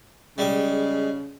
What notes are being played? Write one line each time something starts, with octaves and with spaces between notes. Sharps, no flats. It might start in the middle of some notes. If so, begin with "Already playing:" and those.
C#3 G3 G#3 G5